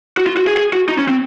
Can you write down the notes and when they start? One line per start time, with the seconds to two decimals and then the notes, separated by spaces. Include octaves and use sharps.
0.17 F#4
0.27 F4
0.37 F#4
0.47 G#4
0.57 G#4
0.73 F#4
0.89 D#4
0.99 C#4
1.09 C4